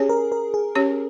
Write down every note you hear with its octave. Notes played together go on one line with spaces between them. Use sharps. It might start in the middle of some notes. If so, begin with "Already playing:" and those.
Already playing: C#4 G4 G#4 C#5
A#4
A#4
G#4
C#4 G4 C#5